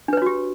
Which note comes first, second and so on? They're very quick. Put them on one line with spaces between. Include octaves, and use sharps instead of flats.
D4 B4 C#5 F#4 G4